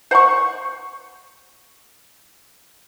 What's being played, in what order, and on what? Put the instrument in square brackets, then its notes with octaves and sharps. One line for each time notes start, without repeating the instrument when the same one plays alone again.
[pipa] C5 F#5 B5 C#6